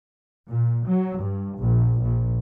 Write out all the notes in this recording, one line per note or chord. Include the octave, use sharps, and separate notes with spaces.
A#2
F#3
G2
A#1
A#1